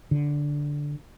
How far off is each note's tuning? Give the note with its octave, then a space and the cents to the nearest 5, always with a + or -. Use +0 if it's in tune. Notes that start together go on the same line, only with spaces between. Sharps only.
D3 -5